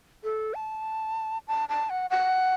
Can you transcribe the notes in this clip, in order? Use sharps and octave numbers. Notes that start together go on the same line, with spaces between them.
A4
A5
A5
A5
F#5
F#5